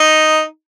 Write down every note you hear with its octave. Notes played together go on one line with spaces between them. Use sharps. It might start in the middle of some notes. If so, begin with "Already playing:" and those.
Already playing: D#4